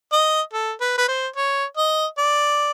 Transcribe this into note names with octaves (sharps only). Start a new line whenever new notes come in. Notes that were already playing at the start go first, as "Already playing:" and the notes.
D#5
A4
B4
B4
C5
C#5
D#5
D5